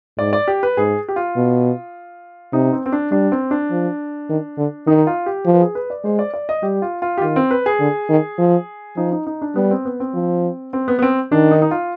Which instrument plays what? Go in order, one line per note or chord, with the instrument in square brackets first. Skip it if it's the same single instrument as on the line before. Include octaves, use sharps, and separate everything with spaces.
[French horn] G#2 [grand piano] D5
[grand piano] D5
G4
B4
[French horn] G#2 [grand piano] G#4
[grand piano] G4
F4
[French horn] B2
[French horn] C3 [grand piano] D#4
[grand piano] C4
C4
D4
[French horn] G3 [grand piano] D4
[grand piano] C4
D4
[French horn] F3
D#3
D3
[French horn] D#3 [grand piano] D#4
[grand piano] F4
G4
[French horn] F3
[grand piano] B4
G#4
B4
D5
[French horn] G#3 [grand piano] C5
[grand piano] D5
D5
D#5
[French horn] G3 [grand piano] G4
[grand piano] F4
F4
G4
[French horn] D#3 [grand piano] F4
[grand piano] C4
B4
G#4
[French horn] D3
D#3
F3
[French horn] F3 [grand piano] D#4
[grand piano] D#4
D#4
D4
[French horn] G3 [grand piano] B3
[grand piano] C4
B3
C4
[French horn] F3
[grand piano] C4
B3
B3
C4
[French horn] D#3 [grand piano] D4
[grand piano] D#4
D#4
F4